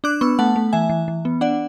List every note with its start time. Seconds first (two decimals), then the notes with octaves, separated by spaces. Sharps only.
0.04 D4 D6 F#6
0.21 B3 C#6 E6
0.39 A3 F#5 A5
0.56 A3
0.73 E3 E5 G#5
0.89 E3
1.08 E3
1.25 B3
1.41 D4 D5 F#5